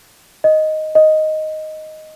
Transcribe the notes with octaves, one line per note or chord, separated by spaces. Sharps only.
D#5
D#5